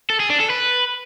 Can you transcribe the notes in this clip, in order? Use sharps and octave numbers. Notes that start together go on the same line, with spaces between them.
A4
G#4
D4
A4
B4